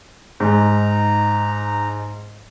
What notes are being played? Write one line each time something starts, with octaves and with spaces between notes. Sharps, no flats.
G#2 D#4 A#5